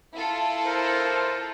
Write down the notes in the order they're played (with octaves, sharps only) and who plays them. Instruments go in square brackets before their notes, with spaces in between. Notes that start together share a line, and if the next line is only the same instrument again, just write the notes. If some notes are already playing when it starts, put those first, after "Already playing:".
[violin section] E4 F4 A4
[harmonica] A#4 C5